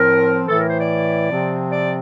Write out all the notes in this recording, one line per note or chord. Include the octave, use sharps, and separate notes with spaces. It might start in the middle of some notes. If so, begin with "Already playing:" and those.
Already playing: A2 F3 C4 A#4
A2 E3 A3 A4
A#4
C5
D5
C3 F3 C4
D5